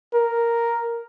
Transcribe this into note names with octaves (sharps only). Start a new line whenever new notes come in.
A#4